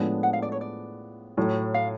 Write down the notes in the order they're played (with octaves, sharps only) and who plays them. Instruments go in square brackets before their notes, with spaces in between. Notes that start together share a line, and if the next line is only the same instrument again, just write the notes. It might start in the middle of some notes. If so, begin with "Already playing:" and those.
Already playing: [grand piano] A2 F3 G#3 B3 D4
[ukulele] F#5
F5
D5
C#5
D5
[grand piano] A2 F#3 A3
[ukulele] F5